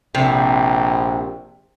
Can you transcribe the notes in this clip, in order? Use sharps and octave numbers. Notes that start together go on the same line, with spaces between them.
A#1 C3